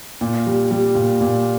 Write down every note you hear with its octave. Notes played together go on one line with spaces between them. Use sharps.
A#2
G3
G3
A#2
A#2